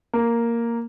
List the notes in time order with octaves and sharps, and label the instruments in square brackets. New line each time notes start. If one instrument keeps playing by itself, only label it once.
[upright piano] A#3